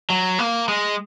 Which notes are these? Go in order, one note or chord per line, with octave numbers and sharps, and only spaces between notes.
F#3
A#3
G#3